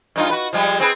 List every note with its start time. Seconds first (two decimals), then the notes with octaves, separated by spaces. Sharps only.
0.16 G2 D#4 F4
0.30 F#4 B4
0.53 F3 G3 G#3
0.80 C4 G#4 B4